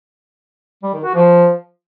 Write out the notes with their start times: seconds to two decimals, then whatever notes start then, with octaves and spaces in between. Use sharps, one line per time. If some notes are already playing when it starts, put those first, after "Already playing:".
0.83 G3
0.94 D#3
1.04 F#4
1.15 F3